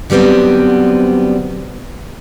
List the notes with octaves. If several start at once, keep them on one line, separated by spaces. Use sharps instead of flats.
D3 F#3 G3 B3 C4